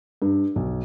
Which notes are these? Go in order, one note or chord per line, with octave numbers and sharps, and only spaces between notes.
G2
B1